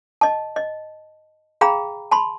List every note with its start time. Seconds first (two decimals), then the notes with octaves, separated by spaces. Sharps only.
0.21 D#5 A5
0.56 D#5
1.61 G#4 F5 G5 A#5 B5
2.11 A5 B5 C6